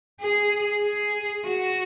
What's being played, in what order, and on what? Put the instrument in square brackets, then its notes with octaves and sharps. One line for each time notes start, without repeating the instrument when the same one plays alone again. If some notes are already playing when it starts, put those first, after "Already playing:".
[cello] G#4
G#4
F#4